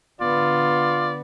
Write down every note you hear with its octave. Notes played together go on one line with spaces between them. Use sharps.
D3 B3 F4 D5